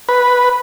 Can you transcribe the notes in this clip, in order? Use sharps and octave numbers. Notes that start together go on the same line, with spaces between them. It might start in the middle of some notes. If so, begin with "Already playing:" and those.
B4